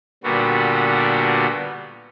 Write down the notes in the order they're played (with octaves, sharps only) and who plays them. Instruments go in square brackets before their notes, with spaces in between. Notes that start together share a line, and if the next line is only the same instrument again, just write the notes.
[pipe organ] A#2 D3 G3 B3 F#4